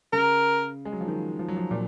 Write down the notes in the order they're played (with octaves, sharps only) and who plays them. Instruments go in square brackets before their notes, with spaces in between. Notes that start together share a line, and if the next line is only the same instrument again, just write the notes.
[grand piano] C#3 [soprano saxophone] A#4
[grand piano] G#3
F#3
F3
D#3
F3
F#3
F3
A#2